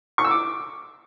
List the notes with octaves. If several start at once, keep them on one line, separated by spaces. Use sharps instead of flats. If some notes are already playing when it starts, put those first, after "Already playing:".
C#6
E6
D6